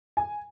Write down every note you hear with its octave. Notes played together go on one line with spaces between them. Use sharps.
G#5